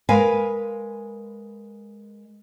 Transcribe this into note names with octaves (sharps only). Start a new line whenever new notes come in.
G#3 A#4 B4 F5 G#5